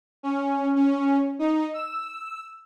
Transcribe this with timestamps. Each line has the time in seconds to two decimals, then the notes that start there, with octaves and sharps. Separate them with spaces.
0.23 C#4
0.76 C#4
1.39 D#4
1.74 E6